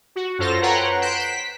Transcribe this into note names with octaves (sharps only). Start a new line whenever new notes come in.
F#4
F#2 F4 A4 C5 A#6
B4 C#5 F#5 G5 A#5 C6
F#6 G6 B6 C7 D7 E7
B6